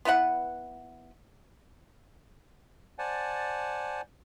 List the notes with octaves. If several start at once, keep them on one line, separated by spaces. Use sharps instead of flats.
B3 E4 B4 F#5
C5 D5 F#5 G#5 A5